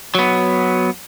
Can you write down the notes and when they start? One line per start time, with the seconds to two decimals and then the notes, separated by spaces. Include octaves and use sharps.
0.15 F#3 B3